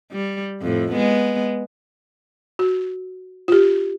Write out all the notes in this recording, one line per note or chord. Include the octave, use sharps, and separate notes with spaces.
G3
F2 A2
G#3 B3
F#4
F4 G4